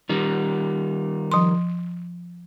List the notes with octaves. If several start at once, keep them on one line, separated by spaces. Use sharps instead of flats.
D#3 G3
F3 C6